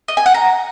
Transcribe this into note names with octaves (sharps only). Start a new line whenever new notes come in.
D#5
G#5
F#5
A#5